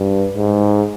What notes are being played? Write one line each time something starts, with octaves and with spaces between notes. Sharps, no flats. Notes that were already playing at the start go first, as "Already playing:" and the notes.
Already playing: G2
G#2